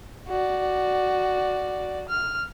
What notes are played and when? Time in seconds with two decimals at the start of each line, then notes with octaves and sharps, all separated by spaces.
0.28 F#4 D5
2.09 F6